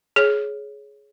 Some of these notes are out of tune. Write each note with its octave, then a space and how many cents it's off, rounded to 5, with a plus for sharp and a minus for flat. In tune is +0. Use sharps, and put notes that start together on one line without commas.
G#4 +15 C#5 +0